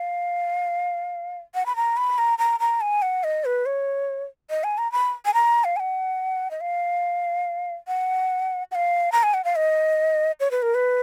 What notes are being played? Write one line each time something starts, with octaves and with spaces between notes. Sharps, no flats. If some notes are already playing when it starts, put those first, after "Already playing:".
Already playing: F5
F#5
B5
A#5
B5
A#5
A#5
A#5
G#5
F#5
D#5
B4
C#5
D#5
G#5
A#5
B5
G#5
A#5
F5
G#5
F#5
D#5
F5
F#5
F#5
F5
A#5
G#5
F#5
F5
D#5
C#5
B4
A#4
B4